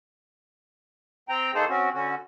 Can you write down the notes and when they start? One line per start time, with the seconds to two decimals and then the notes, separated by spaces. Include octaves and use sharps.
1.29 C4 G5 A#5
1.54 D#3 A#3 D#4 G#4 A4 C5
1.69 C4 C#4 F#4
1.94 D3 C#4 F#4